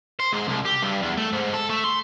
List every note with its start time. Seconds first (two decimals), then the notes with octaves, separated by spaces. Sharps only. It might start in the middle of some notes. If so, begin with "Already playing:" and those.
0.20 C5
0.32 G#2
0.48 C2
0.65 G4
0.82 G2
1.02 E2
1.17 A3
1.33 G#2
1.54 A4
1.70 A3
1.84 C6